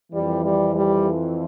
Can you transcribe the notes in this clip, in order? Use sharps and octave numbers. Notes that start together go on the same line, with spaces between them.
F2 E3 G3
G3
G3